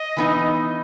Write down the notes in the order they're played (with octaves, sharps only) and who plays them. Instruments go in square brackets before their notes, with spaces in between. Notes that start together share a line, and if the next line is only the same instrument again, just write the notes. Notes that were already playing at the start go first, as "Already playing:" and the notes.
Already playing: [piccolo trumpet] D#5
[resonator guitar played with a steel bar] E3 B3 D#4